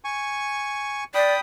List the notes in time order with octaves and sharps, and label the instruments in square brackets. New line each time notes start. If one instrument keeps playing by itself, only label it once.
[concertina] G#5 C#6
[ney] D5 [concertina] G5 B5 D#6